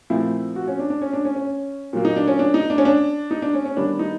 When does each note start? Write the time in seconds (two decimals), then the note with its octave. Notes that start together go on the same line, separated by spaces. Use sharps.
0.10 A#2 F3 A3 C4 E4
0.56 F#4
0.68 C#4
0.79 D4
0.90 D4
1.02 C#4
1.13 D4
1.25 C#4
1.36 C#4
1.93 A#2 F#3 A#3
2.05 D#4
2.16 D4
2.28 C#4
2.39 D4
2.54 D#4
2.70 D4
2.78 C#4
2.85 D4
3.31 D#4
3.42 D4
3.54 C#4
3.66 C#4
3.77 D#3 G3 B3 D4
3.99 D#4